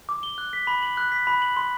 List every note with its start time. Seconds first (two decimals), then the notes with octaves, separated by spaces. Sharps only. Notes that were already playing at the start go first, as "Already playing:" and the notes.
0.09 D6
0.23 G7
0.38 F#6
0.53 B6
0.67 B5
0.83 F#7
0.97 F#6
1.12 B6
1.27 B5
1.42 F#7
1.57 C6